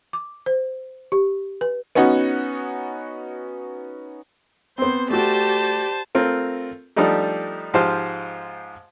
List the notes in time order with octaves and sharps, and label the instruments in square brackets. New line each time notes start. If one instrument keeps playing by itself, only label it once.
[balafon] D6
C5
G4
B4
[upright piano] B3 C#4 D#4 F#4
[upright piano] B3 C4 [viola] C5 C6
[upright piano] A3 F#4 [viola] G4 D5 [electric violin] C5 A5
[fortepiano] A3 C4 F4 A#4
F3 G3 A3 D4 D#4 G4
G#2 F3 F4 G4 C5 F5